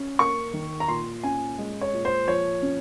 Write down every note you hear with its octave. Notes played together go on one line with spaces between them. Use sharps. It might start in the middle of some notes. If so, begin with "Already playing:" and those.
Already playing: C#4
A#3 C#6
D#3
A#5
A#2 C6
C#4 G#5
G#3
C#5
A#2
C5
F3 C#5
C#4